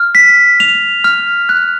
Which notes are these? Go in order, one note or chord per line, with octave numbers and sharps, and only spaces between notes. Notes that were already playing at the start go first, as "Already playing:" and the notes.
Already playing: F6
B6
F7
F6
F#6